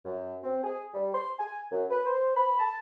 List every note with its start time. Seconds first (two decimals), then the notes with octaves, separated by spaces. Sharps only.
0.05 F#2
0.44 C4
0.64 G#4
0.94 G3
1.15 C6
1.39 G#5
1.72 F#2
1.91 B4
2.06 C5
2.37 B5
2.59 A5